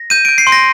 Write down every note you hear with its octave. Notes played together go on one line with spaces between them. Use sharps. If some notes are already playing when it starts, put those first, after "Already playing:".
Already playing: A#6
G6 D#7
G6 D7
C7
C6
A#6